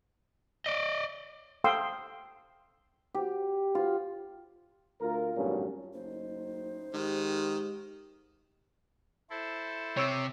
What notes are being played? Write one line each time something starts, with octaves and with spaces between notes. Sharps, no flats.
D5 D#5
A4 F5 G5 C6 D#6 E6
G4
F4
D2 F4 A#4
G#1 G2 A#2 F#3 C#4
F#1 A2 D#4 C5
G#2 D#3 G#3 G4
E4 A4 C5
C3 C#5 E6